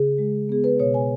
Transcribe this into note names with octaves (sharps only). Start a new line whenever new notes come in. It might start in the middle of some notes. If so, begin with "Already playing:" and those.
Already playing: C#3 G#4
G#3
B3 G#4
B4
B2 C#5
G#5